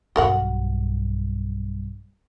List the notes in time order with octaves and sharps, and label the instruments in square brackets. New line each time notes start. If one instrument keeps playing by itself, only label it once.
[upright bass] B1 G2 [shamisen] F#4 A#4 F#5